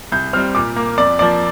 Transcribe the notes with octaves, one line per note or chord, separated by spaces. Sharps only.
C2 G6
C3 G3 C4 F6
A#2 D6
A#3
F2 D5
F3 A#3 D5